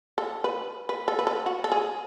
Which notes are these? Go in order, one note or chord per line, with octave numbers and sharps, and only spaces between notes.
A4
B4
B4
A4
B4
A4
F#4
A4
G#4